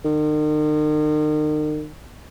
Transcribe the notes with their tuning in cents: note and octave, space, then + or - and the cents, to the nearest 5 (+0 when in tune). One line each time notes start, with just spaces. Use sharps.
D#3 -40